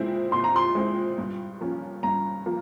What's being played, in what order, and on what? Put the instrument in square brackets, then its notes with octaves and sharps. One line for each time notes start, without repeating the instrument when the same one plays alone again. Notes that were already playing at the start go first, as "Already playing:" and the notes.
Already playing: [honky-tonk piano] A#2 G#3 C4 E4
[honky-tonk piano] A#2 [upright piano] C6
[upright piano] A#5
C6
[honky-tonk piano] G#3 C4 E4
G2
F3 A#3 C#4
[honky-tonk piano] G2 [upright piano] A#5
[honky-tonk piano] F3 A#3